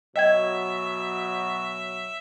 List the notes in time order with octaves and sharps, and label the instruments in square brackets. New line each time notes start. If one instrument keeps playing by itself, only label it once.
[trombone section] B2 F#3 [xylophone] D#5 G5 G#6 [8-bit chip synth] E5